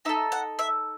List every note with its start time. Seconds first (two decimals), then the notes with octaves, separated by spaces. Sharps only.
0.05 D#4 E5
0.09 A4
0.32 F#5
0.59 E5